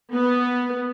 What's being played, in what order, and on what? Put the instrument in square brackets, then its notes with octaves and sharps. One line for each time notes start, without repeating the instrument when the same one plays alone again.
[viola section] B3